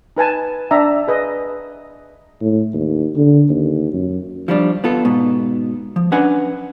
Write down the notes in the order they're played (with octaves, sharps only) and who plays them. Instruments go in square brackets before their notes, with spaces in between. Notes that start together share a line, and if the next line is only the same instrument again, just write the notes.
[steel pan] D#4 B4 G#5 A5
D4 E5 A#5
G#4 B4 D#5
[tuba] A2
D#2
D3
D#2
F#2
[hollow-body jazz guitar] F3 G3 D4
B3 F4 A4
G#2 B2
F3
C#4 D4 B4 F#5 G#5